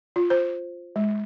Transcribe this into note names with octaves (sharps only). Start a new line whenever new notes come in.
F4
C5
G#3